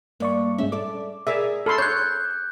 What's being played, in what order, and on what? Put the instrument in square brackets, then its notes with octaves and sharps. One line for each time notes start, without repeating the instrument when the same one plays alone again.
[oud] G2 [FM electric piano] A#3 D5 C#6
[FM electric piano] G#2 G#3 C#4 [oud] E5
[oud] A4 D5 [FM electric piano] D6
[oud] G#4 A#4 D5 [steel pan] E5
[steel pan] A4 B5 C6
[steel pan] C#5 [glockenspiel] F#6 G6